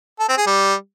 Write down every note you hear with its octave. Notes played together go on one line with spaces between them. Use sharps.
A4
C4
G#4
G3